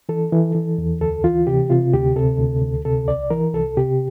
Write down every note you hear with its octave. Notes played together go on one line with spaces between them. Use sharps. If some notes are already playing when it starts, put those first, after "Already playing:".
E3 A4
E3
E3
E2
D2 A4
E3 F4
C3 G4
C3 F4
D2 G4
C3 A4
D2
D2
C3 A4
C2 D5
E3 A#4
C2 A4
C3 G4